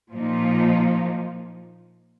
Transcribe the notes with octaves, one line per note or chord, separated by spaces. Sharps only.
A#2 F3 A#3 D#4